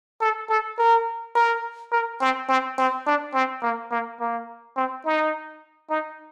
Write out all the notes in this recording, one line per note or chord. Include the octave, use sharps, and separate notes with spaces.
A4
A4
A#4
A#4
A#4
C4
C4
C4
D4
C4
A#3
A#3
A#3
C4
D#4
D#4